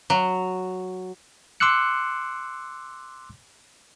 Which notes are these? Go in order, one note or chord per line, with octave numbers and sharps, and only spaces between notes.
F#3
C6 D6 E6 F#6 C#7